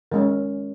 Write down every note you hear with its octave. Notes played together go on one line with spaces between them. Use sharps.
D#3 G#3 C#4 A#4